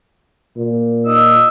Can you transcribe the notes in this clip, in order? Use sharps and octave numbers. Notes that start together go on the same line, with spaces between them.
A#2
D#4 D#6 E6